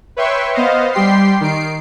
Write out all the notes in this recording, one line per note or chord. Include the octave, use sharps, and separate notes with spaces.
B4 C#5 E5 G5 C6 C#6
B3 C5 D#5 F5
G3 G4 G5 C6 C7
D#3 C7 D7